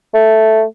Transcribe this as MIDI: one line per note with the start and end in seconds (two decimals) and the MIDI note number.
0.14 0.63 57